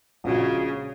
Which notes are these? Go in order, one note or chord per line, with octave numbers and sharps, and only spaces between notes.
A#1 A#2 C#3 G#3 F#4